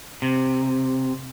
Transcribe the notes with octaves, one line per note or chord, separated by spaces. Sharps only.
C3